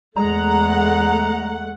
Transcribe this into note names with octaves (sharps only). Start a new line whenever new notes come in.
E2 G#3 A3 F#5 A#5